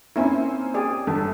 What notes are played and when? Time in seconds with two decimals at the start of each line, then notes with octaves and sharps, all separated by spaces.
0.16 A#3 C4 C#4 D#4 E4
0.74 G4 G#4 D5
1.07 G1 A4